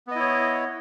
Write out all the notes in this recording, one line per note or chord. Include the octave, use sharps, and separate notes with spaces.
B3 E4 C#5 D#5